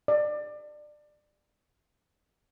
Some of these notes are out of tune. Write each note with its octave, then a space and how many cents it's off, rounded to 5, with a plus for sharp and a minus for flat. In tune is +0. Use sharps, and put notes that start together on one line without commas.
D5 +25